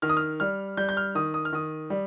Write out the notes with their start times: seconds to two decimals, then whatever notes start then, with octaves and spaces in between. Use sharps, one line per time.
0.02 D#3 F6
0.10 D#6
0.17 F6
0.40 G3 F6
0.77 G3 G6
0.89 G6
0.97 F6
1.15 D#3 D#6
1.34 D#6
1.45 F6
1.53 D#3 D#6
1.90 G3